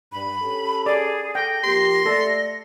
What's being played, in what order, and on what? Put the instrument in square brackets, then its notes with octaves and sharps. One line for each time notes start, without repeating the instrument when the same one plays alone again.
[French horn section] G2 [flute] B5
[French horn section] C#4 G4 A4
[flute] G#4 [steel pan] D5
[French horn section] A4 [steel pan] G5 [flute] A#6
[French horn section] F3 A#3 G4 [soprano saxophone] C6
[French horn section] A3 D5 [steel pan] A4